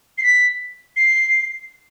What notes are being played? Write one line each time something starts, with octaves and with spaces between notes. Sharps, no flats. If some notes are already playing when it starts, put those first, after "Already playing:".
C7
B6
C7